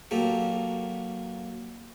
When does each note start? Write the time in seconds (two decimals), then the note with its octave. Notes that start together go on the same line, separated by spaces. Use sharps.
0.11 F#3 A#3 G4 A4